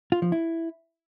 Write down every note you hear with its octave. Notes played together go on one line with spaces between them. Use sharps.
F4
F3
E4